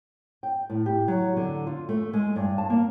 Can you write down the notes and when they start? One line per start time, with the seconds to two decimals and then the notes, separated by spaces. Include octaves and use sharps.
0.43 G5
0.70 A2
0.86 G4
1.08 F#3
1.36 D3
1.67 F4
1.89 A3
2.13 G#3
2.36 G2
2.58 A5
2.70 A#3